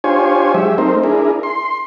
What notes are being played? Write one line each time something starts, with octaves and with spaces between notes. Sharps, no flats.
D4 F4 G4 C5 C#5 G#5
F#3 G#3 G4 E5
A3 C4 D#4 A#4 C5
D4 E4 G#4 A#4
C6